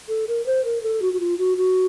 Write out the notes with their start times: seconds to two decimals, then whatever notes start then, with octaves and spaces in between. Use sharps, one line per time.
0.09 A4
0.28 A#4
0.46 C5
0.64 A#4
0.83 A4
1.02 F#4
1.13 F#4
1.20 F4
1.39 F#4
1.57 F#4